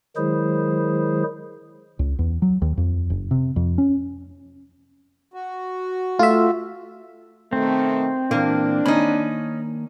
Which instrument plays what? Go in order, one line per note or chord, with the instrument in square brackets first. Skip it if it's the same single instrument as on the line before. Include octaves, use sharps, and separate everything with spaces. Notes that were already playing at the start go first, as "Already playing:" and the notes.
[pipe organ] D#3 F#3 G#3 E4 G#4 C5
[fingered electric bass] C#2
E2
F#3
D#2
F2
F#1
C3
F2
C#4
[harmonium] F#4
[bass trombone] A3 [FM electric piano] F4 E5
[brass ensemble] B2 D#3 A3 [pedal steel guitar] C4
[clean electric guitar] A#2 E3 [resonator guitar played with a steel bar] A#3 [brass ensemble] D4
[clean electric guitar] D#3 A#3 B5 [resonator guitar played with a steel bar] C#4 D#4